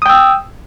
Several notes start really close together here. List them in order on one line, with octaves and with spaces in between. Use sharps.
D#6 G5 E6